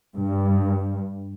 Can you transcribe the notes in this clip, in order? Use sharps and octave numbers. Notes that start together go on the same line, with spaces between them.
G2